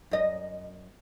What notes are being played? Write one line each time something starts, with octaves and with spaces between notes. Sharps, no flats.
F#2 D#5